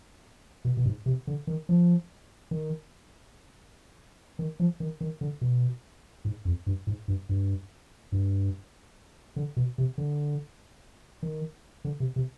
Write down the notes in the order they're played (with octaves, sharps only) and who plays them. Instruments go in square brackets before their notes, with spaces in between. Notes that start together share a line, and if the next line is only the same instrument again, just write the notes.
[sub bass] B2
B2
G#2
C3
D3
D#3
F3
D#3
D#3
F3
D#3
D#3
D3
B2
G#2
F2
G2
G#2
G2
G2
G2
D3
B2
C3
D3
D#3
D3
C3
C3